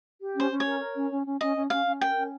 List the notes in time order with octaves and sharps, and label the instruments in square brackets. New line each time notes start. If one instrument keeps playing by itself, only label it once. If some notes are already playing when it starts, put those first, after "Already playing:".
[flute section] G4
C#4
[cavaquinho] C5
[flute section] C#4
[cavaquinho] C#5
[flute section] A#4
A#4
C#4
C#4
C#4
[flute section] C#4 [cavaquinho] D#5
[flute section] C#4
[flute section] C#4 [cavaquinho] F5
[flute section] C#4
[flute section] A#4 [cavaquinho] G5
[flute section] C#4